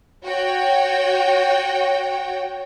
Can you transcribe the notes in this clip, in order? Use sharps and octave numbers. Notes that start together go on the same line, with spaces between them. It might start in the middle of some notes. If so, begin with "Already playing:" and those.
F#4 C#5 G5